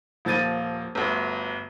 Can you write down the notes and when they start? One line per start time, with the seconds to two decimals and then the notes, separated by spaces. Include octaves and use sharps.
0.25 D#1 F3 A#3 A6 D#7
0.95 G1 D2